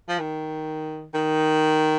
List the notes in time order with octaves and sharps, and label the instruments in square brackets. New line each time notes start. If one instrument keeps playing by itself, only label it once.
[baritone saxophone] F3
D#3
D#3